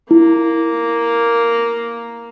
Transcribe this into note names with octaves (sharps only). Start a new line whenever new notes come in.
A#3 E4